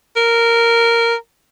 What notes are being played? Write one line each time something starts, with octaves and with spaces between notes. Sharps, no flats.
A#4